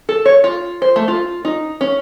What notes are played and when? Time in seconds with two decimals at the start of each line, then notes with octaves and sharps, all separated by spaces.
0.09 A4
0.25 C#5
0.44 F4
0.82 C5
0.96 A3
1.08 F4
1.45 D#4
1.81 C#4